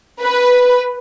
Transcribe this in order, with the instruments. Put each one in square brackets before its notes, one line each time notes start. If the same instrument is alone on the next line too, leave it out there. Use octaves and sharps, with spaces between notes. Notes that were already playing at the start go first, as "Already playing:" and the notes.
[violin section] B4